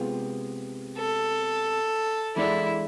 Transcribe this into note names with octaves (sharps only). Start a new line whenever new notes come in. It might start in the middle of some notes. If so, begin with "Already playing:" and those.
Already playing: C3 G#3 B3 F4
A4
E3 G#3 D4 E4 A4 D5